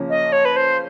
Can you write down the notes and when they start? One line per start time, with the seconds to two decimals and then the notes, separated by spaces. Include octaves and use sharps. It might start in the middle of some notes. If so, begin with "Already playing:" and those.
Already playing: C#3 F3 A#3 C#4
0.10 D#5
0.32 C#5
0.45 B4
0.56 C5